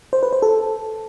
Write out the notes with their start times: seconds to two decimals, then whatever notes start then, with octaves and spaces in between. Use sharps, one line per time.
0.13 C5
0.23 B4
0.33 C5
0.42 A4